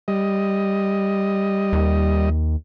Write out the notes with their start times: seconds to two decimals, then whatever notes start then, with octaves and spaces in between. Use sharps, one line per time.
0.08 G3 D#5
1.73 D#2